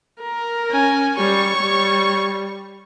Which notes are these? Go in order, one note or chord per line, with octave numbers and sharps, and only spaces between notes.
A#4
C#4 G#5
G3 C#5 C#6
G3